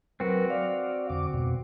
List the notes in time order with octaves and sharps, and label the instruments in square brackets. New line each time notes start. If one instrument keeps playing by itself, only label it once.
[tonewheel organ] F#3 A#4 B4 [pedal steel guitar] C4 F#4
[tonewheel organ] D5 F5
F2 D3 D6
F2 G#2 B2